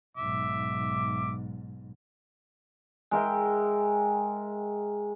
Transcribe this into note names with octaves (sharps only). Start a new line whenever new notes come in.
B1 G#2 E5 D6
G#3 A#4 E5 G5